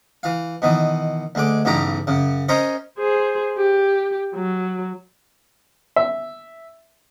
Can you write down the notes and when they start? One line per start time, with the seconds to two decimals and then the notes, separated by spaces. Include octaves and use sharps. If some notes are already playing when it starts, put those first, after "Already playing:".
0.23 E3 F5
0.62 B2 D#3 E3
1.35 D2 G#3 D6
1.65 B1 G2 C#3 E3 G4 A#5
2.07 F#2 C#3
2.48 C#4 A#4 C5 C#5 D#5
2.99 G#4 C5
3.58 G4
4.35 F#3
5.96 E5